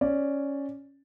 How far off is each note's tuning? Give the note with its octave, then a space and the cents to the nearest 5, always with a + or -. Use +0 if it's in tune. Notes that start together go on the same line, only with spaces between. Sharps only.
C#4 +0 D5 +0